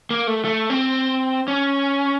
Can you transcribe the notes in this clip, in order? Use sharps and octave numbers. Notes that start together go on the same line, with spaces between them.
A#3
A3
A3
C4
C#4